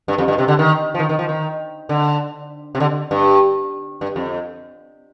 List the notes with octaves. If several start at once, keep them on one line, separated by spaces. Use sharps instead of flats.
G2
F2
G2
C3
D3
D#3
F3
D#3
D#3
F3
D#3
D3
C3
D3
G2
G2
F2